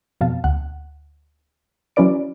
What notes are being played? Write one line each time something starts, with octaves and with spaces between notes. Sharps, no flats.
F2 B2 F5 A5
D2 F#5 F#6
F#3 C#4 E4 B4 D5 D7